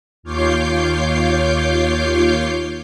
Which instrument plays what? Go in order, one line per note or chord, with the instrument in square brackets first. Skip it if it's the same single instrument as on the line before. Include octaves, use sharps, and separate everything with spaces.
[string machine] D#2 F4 C#5 D6 G6 C7